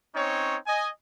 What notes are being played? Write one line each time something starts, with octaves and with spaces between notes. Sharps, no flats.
C4 C#4 D#4 C#5
D#5 G#5